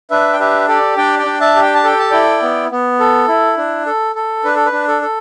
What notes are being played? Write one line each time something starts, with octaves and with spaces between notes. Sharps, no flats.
D4 B4 E5
G5
G4 B4 E5
G4 A4 D5
D4 D5 G5
D5 G5
D4
E5 A5
G4
G5
A5
A4 G5
A5
E4 D5 G5
B3
B3
A4
E4
D4
A4
A4
D4 B4
A4
B4
D4
A4
A4